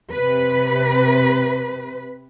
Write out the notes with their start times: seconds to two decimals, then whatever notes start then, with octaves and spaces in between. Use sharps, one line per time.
0.12 C3 B4